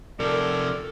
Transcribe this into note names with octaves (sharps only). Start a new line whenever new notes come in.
C3 F3 A4 A#4 D5